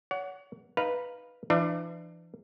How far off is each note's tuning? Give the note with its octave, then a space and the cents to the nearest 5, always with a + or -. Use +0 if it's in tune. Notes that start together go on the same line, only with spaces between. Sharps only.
C#5 +35 F#5 +0
D#4 +0 B4 -5 F5 +0
E3 +40 D4 +30